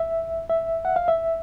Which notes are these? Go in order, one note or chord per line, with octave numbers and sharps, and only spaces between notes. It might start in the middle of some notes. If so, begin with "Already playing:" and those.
Already playing: E5
E5
F#5
F5
E5